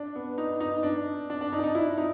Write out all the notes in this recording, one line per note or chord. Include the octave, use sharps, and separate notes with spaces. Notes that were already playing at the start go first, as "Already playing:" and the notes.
Already playing: D4
B3
D#4
D#4
D4
D4
D4
D#4
D4
D#4
E4
D#4